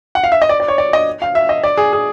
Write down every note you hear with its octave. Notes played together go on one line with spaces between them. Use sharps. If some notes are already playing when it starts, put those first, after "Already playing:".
F#5
F5
E5
D#5
D5
D5
C#5
D5
D#5
F5
E5
D#5
D5
G#4
G#4